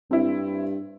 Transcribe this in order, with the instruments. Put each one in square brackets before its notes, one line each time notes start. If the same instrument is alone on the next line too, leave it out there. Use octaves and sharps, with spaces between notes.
[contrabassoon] G2 [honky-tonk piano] C4 E4